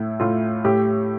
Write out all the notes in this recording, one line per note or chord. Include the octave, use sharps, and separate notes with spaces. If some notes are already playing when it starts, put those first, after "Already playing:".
Already playing: A2 E4
A2 F4
A2 G4